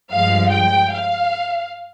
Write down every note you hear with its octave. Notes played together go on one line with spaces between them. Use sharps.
G2 F3 G#3 F5
G5
F5